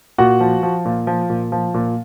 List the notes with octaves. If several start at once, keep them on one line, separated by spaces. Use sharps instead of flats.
A#2 F#4 F#5
F3
F3
A#2
F3
A#2
F3
A#2